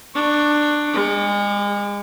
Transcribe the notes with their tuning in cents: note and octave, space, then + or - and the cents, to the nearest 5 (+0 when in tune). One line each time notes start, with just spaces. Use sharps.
D4 +15 C#6 +0
G#3 -35 D6 +15